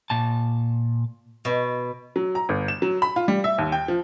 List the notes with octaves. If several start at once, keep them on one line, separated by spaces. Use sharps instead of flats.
A#2 A5
B2
F#3
A#5
G1
E7
F#3
B5
F4
G3
E5
D#2
G5
F3